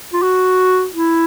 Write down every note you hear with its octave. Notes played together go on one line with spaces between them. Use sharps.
F4
F#4
E4